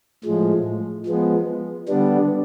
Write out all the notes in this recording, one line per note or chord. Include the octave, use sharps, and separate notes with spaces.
A2 F3 G#3
F3 G#3 B3
D3 G3 B3 D4